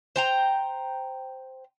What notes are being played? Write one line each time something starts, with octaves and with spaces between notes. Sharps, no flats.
C5 G5 A#5